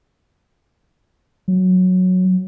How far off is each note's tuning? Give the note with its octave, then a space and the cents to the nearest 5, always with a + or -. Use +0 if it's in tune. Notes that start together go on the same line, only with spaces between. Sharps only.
F#3 -10